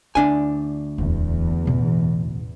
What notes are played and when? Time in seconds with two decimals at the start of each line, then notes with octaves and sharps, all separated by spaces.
0.15 D2 D4 E4 G#5
0.98 D1 E2
1.65 A1 B2